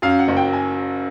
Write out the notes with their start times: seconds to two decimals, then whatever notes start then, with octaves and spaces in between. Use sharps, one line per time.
0.02 F#2 F5
0.19 F#5
0.28 F#1
0.37 G5
0.53 G#5